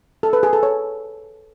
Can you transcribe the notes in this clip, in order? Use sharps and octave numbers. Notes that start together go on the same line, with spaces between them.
A4
B4
G#4
A4
C#5